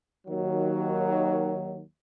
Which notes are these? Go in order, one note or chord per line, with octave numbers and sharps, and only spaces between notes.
D#2 D#3 F#3